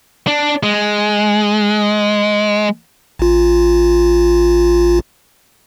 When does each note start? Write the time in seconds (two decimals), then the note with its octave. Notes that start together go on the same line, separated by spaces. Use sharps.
0.27 D4
0.63 G#3
3.19 A1 F4